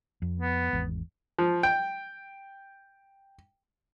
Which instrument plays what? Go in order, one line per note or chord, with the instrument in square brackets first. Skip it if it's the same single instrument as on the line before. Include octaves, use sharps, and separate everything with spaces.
[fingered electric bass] F2
[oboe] B3
[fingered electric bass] G#1 E2
[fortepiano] F3
G5